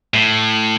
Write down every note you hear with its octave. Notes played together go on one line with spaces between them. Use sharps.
A2